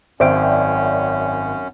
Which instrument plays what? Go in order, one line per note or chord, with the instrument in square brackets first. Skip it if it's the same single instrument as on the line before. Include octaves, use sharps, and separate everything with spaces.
[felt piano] G#1 C5 D7 [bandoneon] F#2 C#4 [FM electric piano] D5 E5 G5